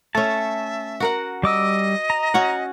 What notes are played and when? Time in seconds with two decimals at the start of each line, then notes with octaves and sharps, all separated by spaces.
0.15 A3 C#4 E5 A5
1.00 F#4 A#4 F#5
1.43 G3 D#5 D6 E6
2.10 A#5
2.34 C#4 F#4 F#5